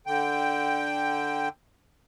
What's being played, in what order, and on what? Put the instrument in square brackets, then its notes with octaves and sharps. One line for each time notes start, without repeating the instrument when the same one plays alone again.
[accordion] D3 G5